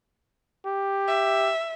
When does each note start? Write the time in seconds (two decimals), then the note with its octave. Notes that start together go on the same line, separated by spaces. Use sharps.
0.66 G4
1.08 E5